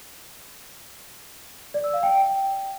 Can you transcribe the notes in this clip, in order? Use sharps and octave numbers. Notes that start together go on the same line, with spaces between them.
D5
E6
F5
G5